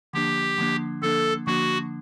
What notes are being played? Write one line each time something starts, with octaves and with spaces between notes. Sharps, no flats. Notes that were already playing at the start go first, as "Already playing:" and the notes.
D3 F3 A#3 D4 G4
D3 F3 A#3 D4
D3 F3 A#3 D4 A4
D3 F3 A#3 D4 F#4